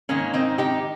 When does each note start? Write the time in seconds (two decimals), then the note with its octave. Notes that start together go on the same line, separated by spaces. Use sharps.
0.09 G#2 D#3 A#3 C#4
0.34 C4 D#4
0.58 D#4 G4